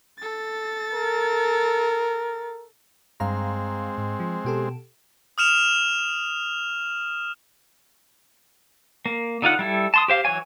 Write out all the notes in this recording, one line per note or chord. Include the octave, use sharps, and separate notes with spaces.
A4 A6
A#4
G2 G#3 C4 F5 A#5
G#2
F3
B2 G4 A4
D#6 F6 E7 F7
A#3
D3 D#4 F4 F#5
G3 E4 A4
A5 C6 D#6
G4 C5 F5
E3 F#3 C#5 G#5